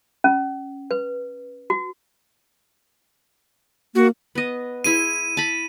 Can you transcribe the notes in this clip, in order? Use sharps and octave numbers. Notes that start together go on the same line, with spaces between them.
C#4
B4
F#4
A#3 F#4
B3 D#5
E4 G#4 C6 D#7
A5 B5